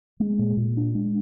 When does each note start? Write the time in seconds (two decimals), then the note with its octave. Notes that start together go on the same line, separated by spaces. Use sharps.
0.20 G#3
0.39 A#2
0.57 A#2
0.77 D4
0.95 G#3